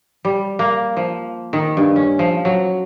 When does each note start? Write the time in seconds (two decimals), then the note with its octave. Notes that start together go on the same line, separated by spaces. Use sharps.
0.25 G3
0.59 A#3
0.97 F3
1.53 D#3
1.77 G2
1.96 C#4
2.19 F3
2.45 F#3